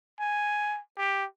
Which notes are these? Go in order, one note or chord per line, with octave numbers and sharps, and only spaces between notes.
G#5
G4